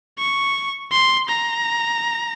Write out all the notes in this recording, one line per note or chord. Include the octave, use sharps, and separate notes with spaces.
C#6
C6
A#5